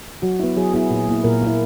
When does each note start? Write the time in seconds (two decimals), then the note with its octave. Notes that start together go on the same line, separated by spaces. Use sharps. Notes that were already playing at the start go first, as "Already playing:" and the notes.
0.22 F#3 F#4
0.40 B3 E4
0.56 F#3 G#4
0.74 B3 E4 G#4
0.91 A#2 G#4
1.08 A#3 E4
1.24 A#2 A#4
1.42 A#3 E4